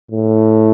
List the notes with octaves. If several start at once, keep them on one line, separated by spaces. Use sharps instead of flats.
A2